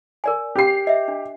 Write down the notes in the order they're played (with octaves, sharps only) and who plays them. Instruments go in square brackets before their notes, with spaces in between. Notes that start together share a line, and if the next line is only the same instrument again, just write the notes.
[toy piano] A#4 D5 G#5
[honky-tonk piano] G4 C7
[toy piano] D#5 E5
D4